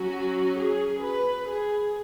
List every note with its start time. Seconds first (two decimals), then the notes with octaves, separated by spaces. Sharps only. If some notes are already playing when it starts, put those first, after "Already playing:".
Already playing: F#3 C#4 F#4
0.58 G#4
1.03 B4
1.48 G#4